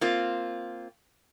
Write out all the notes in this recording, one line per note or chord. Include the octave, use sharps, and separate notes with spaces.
A#3 C4 F4